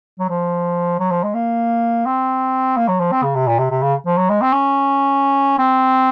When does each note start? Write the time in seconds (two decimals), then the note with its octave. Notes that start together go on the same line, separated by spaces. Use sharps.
0.19 F#3
0.29 F3
1.00 F#3
1.11 F3
1.23 G#3
1.35 A#3
2.06 C4
2.77 A#3
2.88 F#3
3.00 F3
3.12 C4
3.23 C#3
3.35 C3
3.47 A#2
3.59 C3
3.71 C3
3.82 C#3
4.06 F3
4.17 F#3
4.30 G#3
4.41 C4
4.53 C#4
5.59 C4